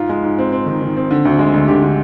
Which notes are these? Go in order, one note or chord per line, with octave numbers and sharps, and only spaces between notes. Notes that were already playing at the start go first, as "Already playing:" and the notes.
Already playing: G#2 F4
G#3
G#2
C4
C4
D#3
D#3
C4
D3
D2
G#3
D2
D3 G4
D3